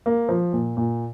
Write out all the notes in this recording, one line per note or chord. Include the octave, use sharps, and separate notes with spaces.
A#3
F3
A#2
A#2